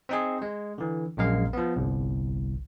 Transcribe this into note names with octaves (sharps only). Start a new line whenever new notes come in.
C4 D#4 G#4
G#3
D3 E3
A#1 F#2 G#3 A#4 F5
F3 B3
G1 C2